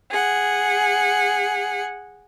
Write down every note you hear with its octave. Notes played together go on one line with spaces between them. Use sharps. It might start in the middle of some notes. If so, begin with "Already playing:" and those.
G#4 F#5